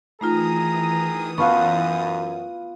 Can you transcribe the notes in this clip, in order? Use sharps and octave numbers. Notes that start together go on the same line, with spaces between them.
D#3 E3 A3 D#4 F4 G#4 A#5 D#6
F#2 B3 F4 F#4 F5 A5 C#6